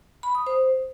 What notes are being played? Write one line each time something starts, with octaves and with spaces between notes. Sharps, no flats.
B5
D#6
C5